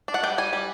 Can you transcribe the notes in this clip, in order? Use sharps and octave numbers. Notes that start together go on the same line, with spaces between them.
D4
F#5
G3 G5
G3 G#5
G3